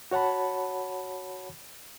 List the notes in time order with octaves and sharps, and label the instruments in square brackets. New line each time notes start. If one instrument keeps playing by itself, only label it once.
[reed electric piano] F#4 C#5 F#5 A5 B5